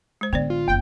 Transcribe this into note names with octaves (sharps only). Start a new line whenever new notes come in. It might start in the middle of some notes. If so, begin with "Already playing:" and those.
G#3 C5
A1 D3 B3 C5 D5
F4
F#1 E2 G5